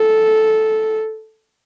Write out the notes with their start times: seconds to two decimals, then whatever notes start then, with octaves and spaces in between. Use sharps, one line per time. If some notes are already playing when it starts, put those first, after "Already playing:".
Already playing: A4